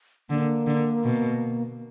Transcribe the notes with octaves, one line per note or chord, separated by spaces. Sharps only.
D3 A#3
D3
B2